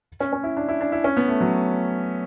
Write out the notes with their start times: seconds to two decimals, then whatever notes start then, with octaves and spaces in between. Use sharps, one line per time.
0.20 C#4
0.33 C#4
0.43 E4
0.57 D4
0.69 E4
0.81 D4
0.92 E4
1.04 C#4
1.17 B3
1.28 A3
1.41 F#3